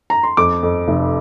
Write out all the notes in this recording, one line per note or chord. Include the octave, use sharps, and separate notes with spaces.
A#5
C6
F2 D6
F2
F1